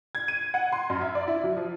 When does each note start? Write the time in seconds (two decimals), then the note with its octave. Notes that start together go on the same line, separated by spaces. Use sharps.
0.15 G#6
0.28 D#7
0.54 F#5
0.72 C6
0.90 F#2
1.01 E5
1.15 D5
1.28 E4
1.44 F#3
1.57 F3